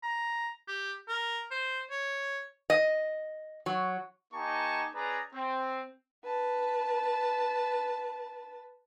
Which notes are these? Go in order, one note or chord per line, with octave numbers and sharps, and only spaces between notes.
A#5
G4
A#4
C5
C#5
D#5
F#3
A#3 D#4 G4 G#5 A5 C#6
C#4 G#4 B4 D5 A#5
C4
B4 A5